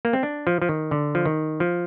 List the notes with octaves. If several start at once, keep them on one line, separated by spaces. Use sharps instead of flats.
A#3
C4
D4
F3
F3
D#3
D3
F3
D#3
F3